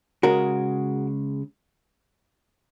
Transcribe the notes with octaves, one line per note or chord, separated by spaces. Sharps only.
C#3 G#3 F#4 A#4